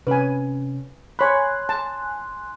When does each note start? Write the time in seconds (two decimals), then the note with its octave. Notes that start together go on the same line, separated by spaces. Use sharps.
0.07 C3 C#4 B4 G#5
1.19 C#5 G#5 B5 C6 F#6
1.69 A5